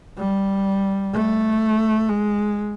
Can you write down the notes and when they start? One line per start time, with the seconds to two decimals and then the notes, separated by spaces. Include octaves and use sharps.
0.18 G3
1.13 A3
2.09 G#3